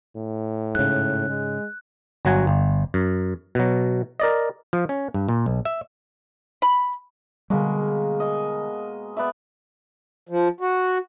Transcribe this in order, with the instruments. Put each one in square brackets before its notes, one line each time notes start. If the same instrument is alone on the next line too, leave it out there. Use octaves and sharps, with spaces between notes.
[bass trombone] A2
[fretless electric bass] G#2 C#3 [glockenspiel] F#6
[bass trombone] G#3
[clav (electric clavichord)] G1 F#3 F#4 G#5
G1
F#2
B2 F#3
A#4 D5 D#5
F3
C#4
G2
A#2
B1
E5
[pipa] B5
[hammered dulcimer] B2 G#3 A#3 [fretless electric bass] D3 G3
[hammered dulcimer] D#5 G#5
B3 D5 E5
[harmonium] F3
F#4